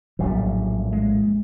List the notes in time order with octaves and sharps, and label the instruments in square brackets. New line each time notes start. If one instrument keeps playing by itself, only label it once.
[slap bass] A#1 F#2 A2 [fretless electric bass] F#3 G3
[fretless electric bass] G#3